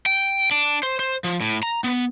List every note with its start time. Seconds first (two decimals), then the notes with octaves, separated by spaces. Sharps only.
0.06 G5
0.51 D4
0.83 C5
0.99 C5
1.24 F3
1.41 A2
1.63 A#5
1.84 B3